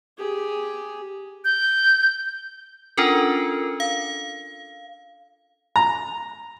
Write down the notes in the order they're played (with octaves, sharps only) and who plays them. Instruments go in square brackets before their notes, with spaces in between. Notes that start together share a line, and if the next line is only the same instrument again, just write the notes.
[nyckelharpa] G4 G#4
[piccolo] G6
[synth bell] C#4 D4 F4 A4 A#4
F5
[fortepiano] A#5